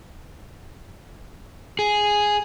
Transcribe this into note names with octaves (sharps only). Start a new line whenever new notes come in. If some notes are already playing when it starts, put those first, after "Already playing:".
G#4